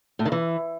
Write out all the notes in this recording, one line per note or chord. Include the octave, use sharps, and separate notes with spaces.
A2
D#3
E3